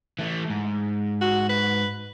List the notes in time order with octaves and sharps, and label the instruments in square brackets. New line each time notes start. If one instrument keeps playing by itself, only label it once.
[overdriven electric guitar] E3 A3
G#2
[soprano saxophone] F#4
B4